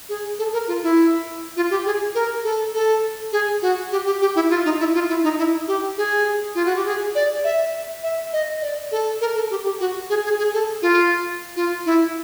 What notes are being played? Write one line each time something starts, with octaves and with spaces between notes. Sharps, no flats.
G#4
A4
A#4
F4
E4
F4
G4
G#4
A#4
A4
A4
G#4
F#4
G4
G4
G4
E4
F4
D#4
E4
F4
E4
D#4
E4
G4
G#4
F4
F#4
G4
G#4
D5
E5
E5
D#5
D5
A4
A#4
A4
G4
G4
F#4
G#4
G#4
G#4
A4
F4
F4
E4